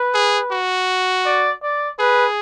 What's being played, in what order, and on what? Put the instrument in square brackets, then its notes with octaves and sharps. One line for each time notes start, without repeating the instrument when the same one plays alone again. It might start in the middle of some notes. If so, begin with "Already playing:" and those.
Already playing: [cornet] B4
[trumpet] G#4
F#4
[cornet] D5
D5
[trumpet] G#4 [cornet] B4